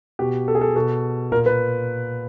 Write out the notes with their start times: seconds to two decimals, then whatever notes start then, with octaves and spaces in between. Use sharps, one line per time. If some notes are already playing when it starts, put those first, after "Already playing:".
0.19 B2 G4
0.48 A4
0.55 G#4
0.61 A4
0.76 B2 A4
1.32 A#2 A#4
1.46 B4